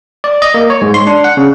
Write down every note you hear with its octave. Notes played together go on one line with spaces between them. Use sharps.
D5
D#5
A#3
C#5
G#2
C6
D4
F#5
C#3